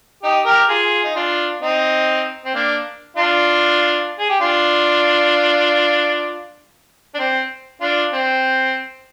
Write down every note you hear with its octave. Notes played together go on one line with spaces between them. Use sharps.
D#4 G4
G4 A#4
F4 G#4
D#4
D4 F4
C4 D#4
C4
A#3 D4
D4 F4
G#4
G4
D4 F4
D4
C4
D4 F4
C4